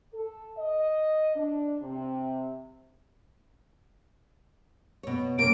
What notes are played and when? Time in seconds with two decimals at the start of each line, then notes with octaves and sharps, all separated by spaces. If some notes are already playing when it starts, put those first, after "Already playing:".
0.13 A4
0.57 D#5
1.35 D4
1.81 C3
5.03 B2 C#5
5.39 C3 A#3 C#4 D7